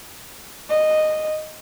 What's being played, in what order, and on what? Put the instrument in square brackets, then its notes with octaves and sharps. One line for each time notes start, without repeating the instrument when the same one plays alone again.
[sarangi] D#5